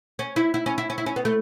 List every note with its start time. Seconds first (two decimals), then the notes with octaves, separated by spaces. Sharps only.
0.19 C#4
0.36 E4
0.54 E4
0.66 C#4
0.78 E4
0.90 C#4
0.98 E4
1.06 C#4
1.16 B3
1.25 A3